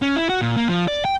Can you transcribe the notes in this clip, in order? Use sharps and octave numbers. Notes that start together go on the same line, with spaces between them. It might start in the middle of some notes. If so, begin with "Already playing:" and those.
C#4
E4
F#4
A#2
A#3
F3
D5
G5